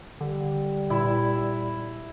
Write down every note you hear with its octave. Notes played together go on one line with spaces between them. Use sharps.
D3 G3
A#2 E4